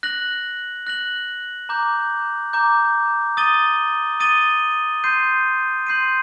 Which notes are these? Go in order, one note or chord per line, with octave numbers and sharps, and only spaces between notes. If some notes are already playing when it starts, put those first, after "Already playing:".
F#6 A#6 F#7
F#6 A#6 F#7
A#5 D6 G6
A#5 D6 G6
D#6 A6 D#7 G7
D#6 A6 D#7 G7
C6 G6 C7 D#7
C6 G6 C7 D#7